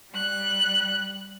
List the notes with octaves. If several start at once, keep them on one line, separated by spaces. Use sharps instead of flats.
G3 F#6